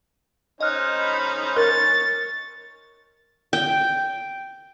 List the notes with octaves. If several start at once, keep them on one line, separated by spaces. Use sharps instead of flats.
C#4 D#4 C5 D#5 F6 F#6
B5
A#4 C#5 A6
G5